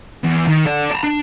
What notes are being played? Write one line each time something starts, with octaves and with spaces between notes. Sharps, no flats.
E2
D#3
A4 D5
A5 A#5
D4